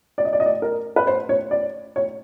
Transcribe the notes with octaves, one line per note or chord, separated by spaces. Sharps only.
D5
D#5
D5
D#5
D5
A#4
B4
C5
C#5
D5
C#5